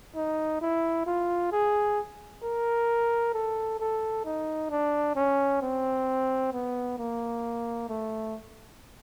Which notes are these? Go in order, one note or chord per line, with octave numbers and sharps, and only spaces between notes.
D#4
E4
F4
G#4
A#4
A4
A4
D#4
D4
C#4
C4
B3
A#3
A3